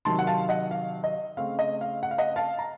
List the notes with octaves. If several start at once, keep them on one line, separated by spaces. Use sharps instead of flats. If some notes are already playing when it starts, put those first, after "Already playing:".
C3 D#3 F#3 A5 C6
F#5
F5 A5
D#5 F#5
F5
D#5
C#3 A3 C4 F5
D#5
F5
F#5
F5
D#5 F#5
F5 A5
A#5